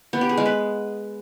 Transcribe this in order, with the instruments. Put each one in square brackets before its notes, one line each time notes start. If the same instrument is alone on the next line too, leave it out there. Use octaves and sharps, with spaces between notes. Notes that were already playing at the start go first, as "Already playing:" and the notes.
[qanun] B3
G4
G#4
G#3
B4